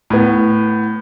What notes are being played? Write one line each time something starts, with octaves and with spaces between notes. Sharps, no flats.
A2 B3